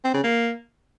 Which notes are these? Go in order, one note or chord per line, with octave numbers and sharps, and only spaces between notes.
C4
C#3
A#3